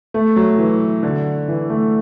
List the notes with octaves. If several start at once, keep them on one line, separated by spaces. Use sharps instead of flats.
A3
F#3
E3
D3
E3
A3